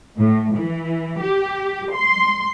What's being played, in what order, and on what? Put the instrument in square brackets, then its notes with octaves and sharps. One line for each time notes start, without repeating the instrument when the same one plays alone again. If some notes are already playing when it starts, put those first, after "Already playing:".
[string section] A2
E3
G4
C6